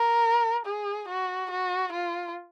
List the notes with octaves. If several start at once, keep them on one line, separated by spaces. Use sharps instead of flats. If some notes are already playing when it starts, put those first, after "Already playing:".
Already playing: A#4
G#4
F#4
F#4
F4